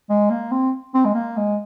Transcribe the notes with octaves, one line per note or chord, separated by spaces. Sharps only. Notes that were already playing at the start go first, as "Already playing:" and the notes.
G#3
A#3
C4
C4
G#3
A#3
G#3